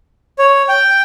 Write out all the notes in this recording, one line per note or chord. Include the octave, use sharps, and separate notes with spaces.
C#5
G5